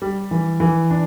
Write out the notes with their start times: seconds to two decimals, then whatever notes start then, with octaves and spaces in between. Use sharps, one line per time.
0.02 G3
0.31 E3
0.60 E3
0.90 D4